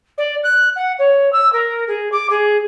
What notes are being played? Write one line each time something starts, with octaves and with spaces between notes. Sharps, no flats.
D5
F#6
F#5
C#5
E6
A#4
G#4
D6
G#4